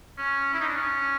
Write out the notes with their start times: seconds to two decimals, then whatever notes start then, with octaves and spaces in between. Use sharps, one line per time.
0.18 C#4
0.53 E4
0.60 D#4
0.69 D4
0.76 C#4